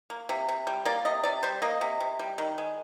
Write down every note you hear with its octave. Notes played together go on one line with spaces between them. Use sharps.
A#3
C3
C3
G3
A#3 D5
C3 D#5
C3 D5
G3 C5
A#3 D#5
C3
C3
G3
D#3
G#3